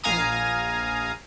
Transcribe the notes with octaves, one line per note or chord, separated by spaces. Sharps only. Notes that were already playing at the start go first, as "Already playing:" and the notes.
A#1 F5 G#5 A#5 D#6